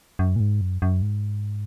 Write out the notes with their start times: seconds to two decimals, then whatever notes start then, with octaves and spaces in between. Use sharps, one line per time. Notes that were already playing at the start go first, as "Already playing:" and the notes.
0.19 F#2
0.36 A#2
0.40 G#2
0.61 F#2
0.82 F#2
1.02 G#2